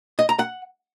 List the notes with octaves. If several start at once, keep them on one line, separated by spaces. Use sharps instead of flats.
D#5
A#5
F#5